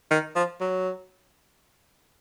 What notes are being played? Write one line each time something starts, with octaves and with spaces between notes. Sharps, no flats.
D#3
F3
F#3